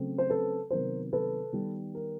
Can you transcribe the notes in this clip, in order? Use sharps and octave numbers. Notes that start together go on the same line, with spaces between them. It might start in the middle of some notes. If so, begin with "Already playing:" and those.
Already playing: C#3 F#3 A3 C4
C5
A4 B4
C3 D#3 F#3 B3 A#4 C5
A4 B4
D#3 G3 B3
A#4